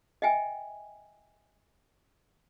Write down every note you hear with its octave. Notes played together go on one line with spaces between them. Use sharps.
D#5 E5 G5 G#5